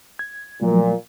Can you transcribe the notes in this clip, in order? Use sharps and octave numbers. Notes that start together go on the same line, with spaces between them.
G#6
A#2 F3 F#3 A3